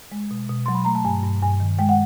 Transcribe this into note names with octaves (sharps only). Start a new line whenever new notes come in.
G#3
B2
B2
F#3 C6
B5
A3 A#5
A5
G2 G#5
G2
G2 G#5
D#3
G#3 G5
F#5